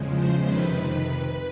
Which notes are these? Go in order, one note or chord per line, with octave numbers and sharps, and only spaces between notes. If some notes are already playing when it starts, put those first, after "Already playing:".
Already playing: E2 C#3 F3 G#3
C5
F2 C3 D#3 B4